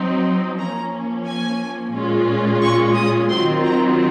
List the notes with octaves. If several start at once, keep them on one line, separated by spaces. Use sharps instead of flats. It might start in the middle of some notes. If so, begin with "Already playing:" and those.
Already playing: F#3 C4 D#4
F3 A#3 C#4 A#5
G#5
A#2 G#3 C#4 F4
C#6
D#6
D#3 F#3 C4 F4 C6
A#5